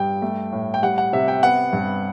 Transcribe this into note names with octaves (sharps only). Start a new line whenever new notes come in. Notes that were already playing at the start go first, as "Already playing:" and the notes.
Already playing: G2 G3 G5
A3
A2
G5
G3 F#5
F#5
C3 E5
G5
B3 F#5
G2